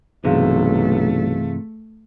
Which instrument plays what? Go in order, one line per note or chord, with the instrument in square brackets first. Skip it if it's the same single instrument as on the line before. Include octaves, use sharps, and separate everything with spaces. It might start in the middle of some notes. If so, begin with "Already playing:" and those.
[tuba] B1 [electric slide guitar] G2 C3 E3 [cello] A3 [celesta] G#4 F5